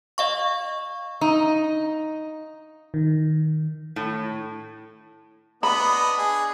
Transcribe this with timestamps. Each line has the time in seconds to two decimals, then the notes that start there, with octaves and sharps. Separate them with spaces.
0.18 D#5 F5 C#6
1.21 D#4
2.94 D#3
3.96 A2
5.63 B3 D4 D#5 B5
6.18 G#4